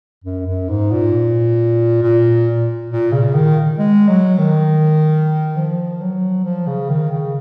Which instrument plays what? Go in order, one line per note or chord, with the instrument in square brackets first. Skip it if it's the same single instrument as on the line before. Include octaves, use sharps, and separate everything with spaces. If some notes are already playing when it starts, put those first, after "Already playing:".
[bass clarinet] F#2
F#2
G#2
A#2
A#2
A#2
C#3
D#3
G#3
F#3
D#3
F3
F#3
F3
C#3
D#3
C#3